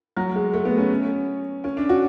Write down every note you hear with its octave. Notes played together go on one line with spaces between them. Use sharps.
F#3
G#3
A3
B3
C#4
C#4
D4
F#4